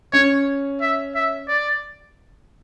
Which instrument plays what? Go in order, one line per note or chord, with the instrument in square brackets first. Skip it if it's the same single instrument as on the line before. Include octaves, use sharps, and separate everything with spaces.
[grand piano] C#4 [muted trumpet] C#5
[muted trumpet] E5
E5
D5